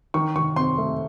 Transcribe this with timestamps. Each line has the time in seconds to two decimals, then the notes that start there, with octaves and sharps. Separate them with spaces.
0.14 D#3 C#6
0.36 D#3 C#6
0.56 C4 C6
0.78 A3